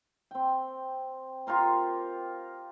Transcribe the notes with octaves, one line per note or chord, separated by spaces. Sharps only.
C4 G5
F4 G4 A#4 C6